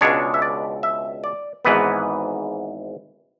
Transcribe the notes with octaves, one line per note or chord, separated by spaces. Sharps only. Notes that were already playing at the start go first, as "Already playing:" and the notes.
C#2 B2 G#3 D4 C#5
E5
D5
E5
D5
G#1 G#2 E3 B3 B4